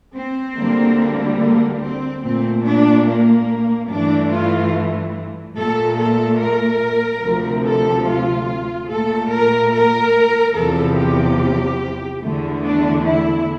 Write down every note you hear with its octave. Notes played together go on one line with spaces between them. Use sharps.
C4
D2 D3 G3 A#3
A#3
C4
A#2 A3 C4
D4
A#3
G2 E3 A3 D4
F4
A#2 A3 A4
A4
A#4
D2 C3 F3
A4
F4
A#2 A3 A4
A#4
A#4
E2 C3 F3 A4
G4
E2 D3 A3
D4
E4